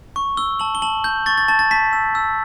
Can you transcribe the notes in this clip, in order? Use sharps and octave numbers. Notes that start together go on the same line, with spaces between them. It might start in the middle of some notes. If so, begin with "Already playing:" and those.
C#6
E6 G7
A5 F#7
G7
A5 F#7
G6
C#6 A6
A6
A5 A6
A6
A5 B6
E6
E6